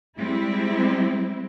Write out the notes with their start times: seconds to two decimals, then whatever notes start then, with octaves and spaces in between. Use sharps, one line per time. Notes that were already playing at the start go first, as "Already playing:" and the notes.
0.18 G3 G#3 C4 E4